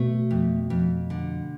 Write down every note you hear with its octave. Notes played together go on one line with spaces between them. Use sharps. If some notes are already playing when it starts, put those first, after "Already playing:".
Already playing: B2 A3
F2
F2
D3